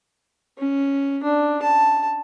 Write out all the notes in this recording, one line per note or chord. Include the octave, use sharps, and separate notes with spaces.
C#4
D4
A5